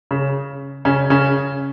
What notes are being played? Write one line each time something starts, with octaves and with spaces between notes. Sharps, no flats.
C#3
C#3 C#4
C#3 C#4